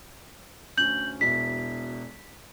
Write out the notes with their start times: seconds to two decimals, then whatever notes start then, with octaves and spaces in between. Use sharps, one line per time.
0.78 D2 C#4 G6 F#7
1.21 E1 B2 E4 B6